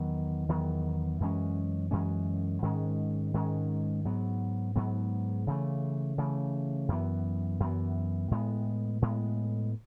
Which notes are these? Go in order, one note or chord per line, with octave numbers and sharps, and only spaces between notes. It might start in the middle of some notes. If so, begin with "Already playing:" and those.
Already playing: E2 D#3 F#3 B3
E2 D#3 F#3 B3
F#2 E3 G#3 C#4
F#2 E3 G#3 C#4
G#2 D#3 G#3 C#4
G#2 D#3 G#3 C#4
G#2 F#3 B3
G#2 F#3 B3
C#3 E3 A3
C#3 E3 A3
F#2 E3 B3
F#2 E3 B3
A2 G#3 B3
A2 G#3 B3